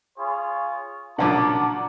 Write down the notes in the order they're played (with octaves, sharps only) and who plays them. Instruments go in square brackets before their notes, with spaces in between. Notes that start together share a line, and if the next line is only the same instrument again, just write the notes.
[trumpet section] F4 G#4 C#5
[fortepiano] B1 A#2 C#3 [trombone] D4 [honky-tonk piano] F#5 A#5 D6 [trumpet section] A5